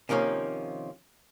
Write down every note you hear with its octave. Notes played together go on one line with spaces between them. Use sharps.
C3 D#3 F3 A#3 C#4